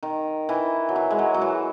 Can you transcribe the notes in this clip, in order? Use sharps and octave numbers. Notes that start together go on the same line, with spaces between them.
D#3
E3
F#3
E3
G#3
F#3
F#3
E3